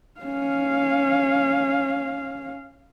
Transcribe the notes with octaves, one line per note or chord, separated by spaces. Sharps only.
C#4 F5